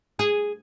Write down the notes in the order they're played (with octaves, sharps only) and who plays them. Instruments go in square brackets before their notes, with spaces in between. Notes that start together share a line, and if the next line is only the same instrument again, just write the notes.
[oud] G#4